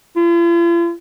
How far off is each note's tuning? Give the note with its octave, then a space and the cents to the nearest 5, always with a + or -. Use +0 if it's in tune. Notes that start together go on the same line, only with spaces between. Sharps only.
F4 -45